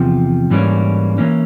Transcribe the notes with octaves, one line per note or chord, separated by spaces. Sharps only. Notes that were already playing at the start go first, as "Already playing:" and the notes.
Already playing: E2 C3 F3
G#2 E3 G3 A#3 C#4
E3 A#3 C#4